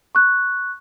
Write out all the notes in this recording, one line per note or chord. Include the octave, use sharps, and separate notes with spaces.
C#6 F#6